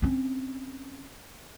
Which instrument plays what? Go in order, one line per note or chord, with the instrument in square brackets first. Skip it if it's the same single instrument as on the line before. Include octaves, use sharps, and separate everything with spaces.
[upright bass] C4 C#4